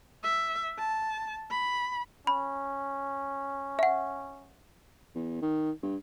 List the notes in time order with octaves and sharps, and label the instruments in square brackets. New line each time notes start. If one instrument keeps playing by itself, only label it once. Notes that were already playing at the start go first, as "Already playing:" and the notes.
[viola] E5
A5
B5
[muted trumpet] C#4 [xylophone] B5
[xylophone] E5 F#5
[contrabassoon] E2
D#3
G2